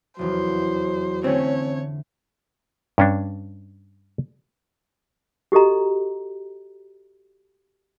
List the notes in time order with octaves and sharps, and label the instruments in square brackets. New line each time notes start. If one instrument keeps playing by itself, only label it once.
[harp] F1 E2 [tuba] F#3 [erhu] C5
[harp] D3 A3 [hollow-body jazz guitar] C4 C#4 [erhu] C#5
[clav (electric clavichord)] G2 C#4 D4
[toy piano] F#4 G4 A4 D#5 A#5